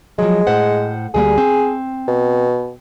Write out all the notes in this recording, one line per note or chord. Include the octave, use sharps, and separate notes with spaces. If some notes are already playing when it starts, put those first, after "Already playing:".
F3 F#3 G#3
A2 C5 F#5
D2 G3 A#3 G#4
C4
B2